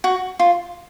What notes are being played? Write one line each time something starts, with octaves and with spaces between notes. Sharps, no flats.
F#4
F4